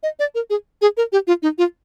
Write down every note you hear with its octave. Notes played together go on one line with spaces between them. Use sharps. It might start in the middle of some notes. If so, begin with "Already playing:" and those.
D#5
D5
A#4
G#4
G#4
A#4
G4
F4
D#4
F4